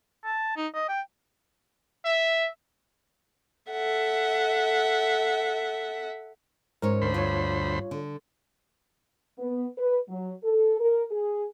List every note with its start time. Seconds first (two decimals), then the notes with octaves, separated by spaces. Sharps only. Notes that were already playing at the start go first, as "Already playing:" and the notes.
0.25 A5
0.57 D#4
0.74 D#5
0.89 G5
2.05 E5
3.70 A4 E5 F#5
6.82 G#2 C#4 A#4 C#5
7.02 D2 C5 B5
7.14 G2 F4 C#5
7.91 D3
9.39 B3
9.78 B4
10.08 F#3
10.44 A4
10.80 A#4
11.11 G#4